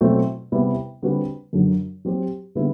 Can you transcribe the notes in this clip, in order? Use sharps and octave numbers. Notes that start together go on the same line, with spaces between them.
B2 F#3 A3 C4 E4
C3 G3 B3 E4 B4
D3 G3 C4 F#4 B4
F#2 D3 F#3
F#3 C4 G4
D3 G3 B3 E4 B4